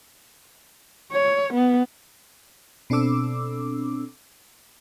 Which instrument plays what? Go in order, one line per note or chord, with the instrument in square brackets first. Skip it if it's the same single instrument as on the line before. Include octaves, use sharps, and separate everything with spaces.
[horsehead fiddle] C#5
B3
[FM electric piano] B2 C4 D4 A4 D6 E6